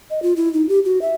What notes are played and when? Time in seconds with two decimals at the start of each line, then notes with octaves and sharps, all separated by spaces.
0.10 D#5
0.22 F4
0.36 E4
0.53 D#4
0.69 G4
0.85 F#4
1.02 E5